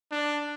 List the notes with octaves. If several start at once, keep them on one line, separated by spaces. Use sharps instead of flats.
D4